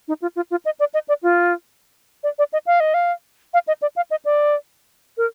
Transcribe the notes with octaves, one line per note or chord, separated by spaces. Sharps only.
D#4
F4
F4
F4
D#5
D5
D#5
D5
F4
D5
D5
D#5
F5
D#5
F5
F5
D#5
D5
F5
D#5
D5
A#4